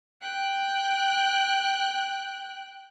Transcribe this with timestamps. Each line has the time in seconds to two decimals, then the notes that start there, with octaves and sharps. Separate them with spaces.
0.21 G5 F#6